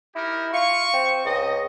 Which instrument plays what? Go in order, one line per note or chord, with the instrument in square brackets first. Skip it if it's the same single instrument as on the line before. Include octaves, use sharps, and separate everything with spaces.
[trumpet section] D#4 G4 A#4 [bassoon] E4
[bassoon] F4 [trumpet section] C#6
[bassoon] C4
[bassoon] C#2 [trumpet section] D#5